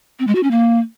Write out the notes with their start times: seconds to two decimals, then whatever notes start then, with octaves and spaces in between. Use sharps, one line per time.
0.19 C4
0.27 G#3
0.35 F#4
0.43 C#4
0.51 A#3